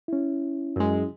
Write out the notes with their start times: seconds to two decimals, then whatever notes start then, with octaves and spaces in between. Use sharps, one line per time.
0.08 C#4 E4
0.76 F#2 G#3